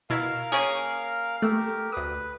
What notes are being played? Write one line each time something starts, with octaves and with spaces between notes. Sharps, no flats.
B2 E4 A#4 F5 A6
A#3 C#4 G#4 C#7
A3 G4 A#4
D2 B4 D#6